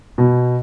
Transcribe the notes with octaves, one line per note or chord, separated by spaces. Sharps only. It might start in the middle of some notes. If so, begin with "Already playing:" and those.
B2